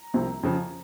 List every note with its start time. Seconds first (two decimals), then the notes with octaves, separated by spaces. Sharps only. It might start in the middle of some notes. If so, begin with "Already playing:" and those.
Already playing: A#5
0.14 C2 C3 F3
0.43 F2 C#3 F3